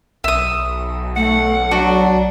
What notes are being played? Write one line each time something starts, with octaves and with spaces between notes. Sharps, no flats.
B1 E5 D#6
A3 F#5
F#3 D4 F#4